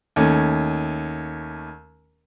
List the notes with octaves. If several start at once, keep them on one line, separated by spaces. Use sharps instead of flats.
D#2 A3 C#4